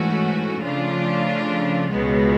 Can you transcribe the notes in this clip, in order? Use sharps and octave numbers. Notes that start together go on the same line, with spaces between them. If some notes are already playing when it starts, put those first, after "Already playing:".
Already playing: G#2 E3 A3 C#4 F#4
C#3 F3 A3 D4 F4
C#2 B2 G#3 B3